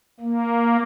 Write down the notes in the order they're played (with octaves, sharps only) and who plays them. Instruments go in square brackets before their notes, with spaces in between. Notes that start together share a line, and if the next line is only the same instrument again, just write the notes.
[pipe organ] A#3